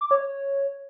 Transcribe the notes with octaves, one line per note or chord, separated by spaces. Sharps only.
D6
C#5
C#5